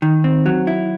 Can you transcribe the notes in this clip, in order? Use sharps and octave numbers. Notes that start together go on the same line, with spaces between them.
D#3
C4
F#3
E4